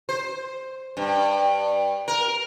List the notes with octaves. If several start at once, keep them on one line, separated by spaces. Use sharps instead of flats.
C5
G2
A#4